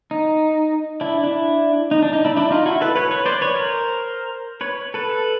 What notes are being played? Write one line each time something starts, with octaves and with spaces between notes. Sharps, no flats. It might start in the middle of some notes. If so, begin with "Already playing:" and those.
D#4
D4 E4
D4 E4
D#4
D4
D#4
D4 E4
D4 E4
D#4 F4
E4 F#4
A4 B4
B4 C#5
B4 C#5
C5 D5
B4 C#5
A#4 C5
B4 C#5
A4 B4